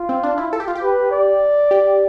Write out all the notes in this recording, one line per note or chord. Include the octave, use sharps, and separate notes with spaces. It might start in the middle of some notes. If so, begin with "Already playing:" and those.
Already playing: F4
C4
D4
E4
A4
G4
F4
G4
B4
D5
G4